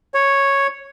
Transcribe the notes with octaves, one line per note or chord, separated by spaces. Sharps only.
C#5